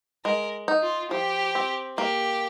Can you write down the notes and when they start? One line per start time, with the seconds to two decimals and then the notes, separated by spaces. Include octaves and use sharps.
0.25 G#3 A#4
0.68 D#4
0.82 F4
1.11 F3 G4
1.55 C4
1.98 A#3 G4